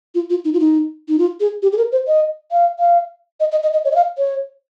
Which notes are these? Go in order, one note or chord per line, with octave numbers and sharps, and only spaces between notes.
F4
F4
D#4
F4
D#4
D#4
F4
G#4
G4
G#4
A#4
C5
D#5
F5
F5
D#5
D#5
D#5
D#5
C#5
D#5
F5
C#5